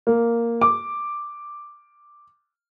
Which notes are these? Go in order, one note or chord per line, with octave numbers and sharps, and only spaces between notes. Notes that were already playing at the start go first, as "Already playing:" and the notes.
A#3
D6